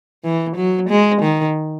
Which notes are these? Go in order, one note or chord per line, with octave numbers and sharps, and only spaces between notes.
E3
F#3
G#3
D#3